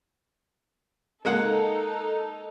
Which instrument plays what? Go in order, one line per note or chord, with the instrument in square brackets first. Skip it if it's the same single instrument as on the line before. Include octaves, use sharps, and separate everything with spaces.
[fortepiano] G#3 A#3 F#5 [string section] D#4 A4